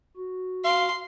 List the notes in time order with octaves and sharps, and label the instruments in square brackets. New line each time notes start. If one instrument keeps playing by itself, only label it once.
[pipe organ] F#4
[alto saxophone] F5 [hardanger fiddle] C6